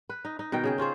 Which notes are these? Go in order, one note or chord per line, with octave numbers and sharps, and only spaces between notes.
B4
D#4
D#4
B2 D#3 A#4 G5
C#3 G#4 G5
C#4 F4 G#4 C5